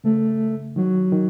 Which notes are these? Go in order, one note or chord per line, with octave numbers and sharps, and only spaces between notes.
C#3 A3
D#3 F#3
D#3